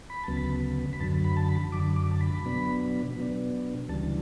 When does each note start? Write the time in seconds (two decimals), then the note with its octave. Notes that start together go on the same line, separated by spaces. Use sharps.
0.10 B5
0.24 D2 C#3 F#3 B3 A5
0.37 B5
0.93 B5
1.00 F#2 D3 F#3 A5
1.24 B5
1.37 A5
1.48 B5
1.72 F#2 D3 F#3 D6
1.96 D6
2.11 A5
2.21 B5
2.45 B2 F#3 B3 D4
3.17 B2 F#3 B3 D4
3.89 D2 C#3 E3 G3 D4 A5